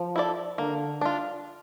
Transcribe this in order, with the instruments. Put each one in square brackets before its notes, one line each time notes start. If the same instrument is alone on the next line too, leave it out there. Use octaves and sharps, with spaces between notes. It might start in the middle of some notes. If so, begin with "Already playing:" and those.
Already playing: [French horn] F3
[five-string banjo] E4 A4 D5
[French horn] D3 [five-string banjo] A#3
[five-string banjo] D4 F4